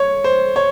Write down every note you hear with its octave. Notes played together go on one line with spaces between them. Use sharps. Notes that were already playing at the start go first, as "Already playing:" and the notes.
Already playing: C#5
C5
C#5